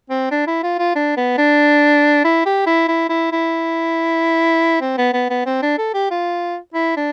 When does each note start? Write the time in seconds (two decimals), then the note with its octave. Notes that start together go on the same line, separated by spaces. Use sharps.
0.10 C4
0.31 D4
0.47 E4
0.63 F4
0.79 F4
0.96 D4
1.17 B3
1.38 D4
2.24 E4
2.46 G4
2.66 E4
2.88 E4
3.09 E4
3.32 E4
4.81 C4
4.98 B3
5.13 B3
5.30 B3
5.46 C4
5.62 D4
5.78 A4
5.94 G4
6.11 F4
6.74 E4
6.97 D4